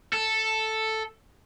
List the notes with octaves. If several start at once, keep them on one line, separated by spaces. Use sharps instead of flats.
A4